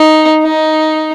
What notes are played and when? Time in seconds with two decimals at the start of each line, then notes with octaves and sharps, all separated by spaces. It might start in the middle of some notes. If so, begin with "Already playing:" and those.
Already playing: D#4
0.42 D#4